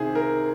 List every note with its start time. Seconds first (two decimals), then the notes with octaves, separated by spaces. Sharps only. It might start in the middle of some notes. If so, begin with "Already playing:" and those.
Already playing: C2 C3 D#3 G#4 C5
0.15 A#4